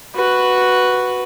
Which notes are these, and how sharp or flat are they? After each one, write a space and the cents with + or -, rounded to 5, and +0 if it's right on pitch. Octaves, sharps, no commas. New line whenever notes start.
F#4 +0 B4 +0